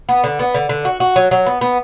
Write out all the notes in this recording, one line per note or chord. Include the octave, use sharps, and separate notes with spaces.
B3
D3
B3
D3
D3
F#4
F#4
F#3
F#3
B3
B3